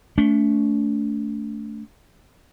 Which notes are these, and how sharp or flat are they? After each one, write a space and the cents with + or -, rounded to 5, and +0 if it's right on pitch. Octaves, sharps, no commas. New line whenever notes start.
A3 +0 D4 -40